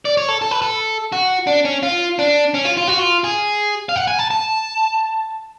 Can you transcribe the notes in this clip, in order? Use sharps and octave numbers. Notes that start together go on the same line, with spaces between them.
D5
C#5
A4
A4
B4
A4
F#4
D4
C#4
F4
D4
C#4
F4
F4
F#4
F4
G#4
F5
F#5
G#5
A5
A5